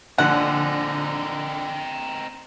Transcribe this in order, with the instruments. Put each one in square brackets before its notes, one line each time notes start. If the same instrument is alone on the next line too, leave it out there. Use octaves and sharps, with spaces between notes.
[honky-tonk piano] A#1 D3 [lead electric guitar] C4 D#4 [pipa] F#5